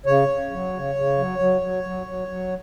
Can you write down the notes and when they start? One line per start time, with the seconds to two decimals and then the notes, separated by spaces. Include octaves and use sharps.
0.06 C#3 C#5
0.28 C#3
0.51 F#3
0.73 C#3
0.95 C#3
1.18 F#3
1.39 F#3
1.61 F#3
1.84 F#3
2.06 F#3
2.28 F#3